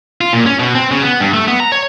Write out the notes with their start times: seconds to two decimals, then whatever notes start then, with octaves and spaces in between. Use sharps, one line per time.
0.21 F4
0.33 A#2
0.46 C#4
0.59 B2
0.75 C4
0.91 C#3
1.03 B3
1.20 G2
1.34 A3
1.48 B3
1.60 A#5
1.72 C#5